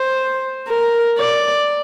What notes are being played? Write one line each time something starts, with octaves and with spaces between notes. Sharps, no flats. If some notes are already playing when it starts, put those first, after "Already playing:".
Already playing: C5
A#4
D5